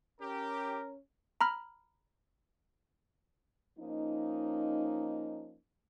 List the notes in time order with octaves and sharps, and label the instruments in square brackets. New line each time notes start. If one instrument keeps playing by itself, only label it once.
[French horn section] C#4 [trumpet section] G4 [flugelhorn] A#4
[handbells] A#5 B5 F6
[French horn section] F3 A#3 C#4 D#4